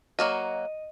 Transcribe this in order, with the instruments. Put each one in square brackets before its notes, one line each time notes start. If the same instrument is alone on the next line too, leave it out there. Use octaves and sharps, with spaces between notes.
[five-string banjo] F#3 A#3 F#4 [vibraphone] D#5